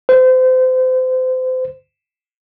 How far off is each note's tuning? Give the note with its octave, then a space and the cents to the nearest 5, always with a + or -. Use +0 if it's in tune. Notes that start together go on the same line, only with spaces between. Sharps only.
C5 -30